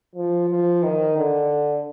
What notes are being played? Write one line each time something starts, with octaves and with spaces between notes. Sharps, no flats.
F3
F3
D#3
D3